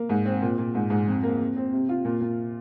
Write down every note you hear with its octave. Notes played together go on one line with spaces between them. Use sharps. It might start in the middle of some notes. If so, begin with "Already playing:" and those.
Already playing: A#3
G#2
C4
A#2
A#2
G#2
G#2
F2
A#3
F2
C4
C3
F4
A#2
A#2